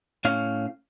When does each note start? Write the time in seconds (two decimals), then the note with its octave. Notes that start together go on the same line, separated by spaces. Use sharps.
0.25 A2 C#4 F5